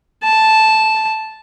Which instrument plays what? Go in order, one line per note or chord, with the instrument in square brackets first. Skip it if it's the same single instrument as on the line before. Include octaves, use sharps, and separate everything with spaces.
[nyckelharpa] A5